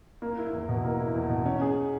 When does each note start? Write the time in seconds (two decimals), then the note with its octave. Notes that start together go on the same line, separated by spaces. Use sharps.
0.22 A#3
0.38 E4
0.53 E2
0.69 B2
0.85 A#3
0.99 E4
1.14 E2
1.30 B2
1.46 C#4
1.61 G#4